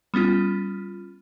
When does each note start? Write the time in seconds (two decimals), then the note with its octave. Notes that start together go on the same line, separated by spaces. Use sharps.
0.14 G3 B3 C#4 F4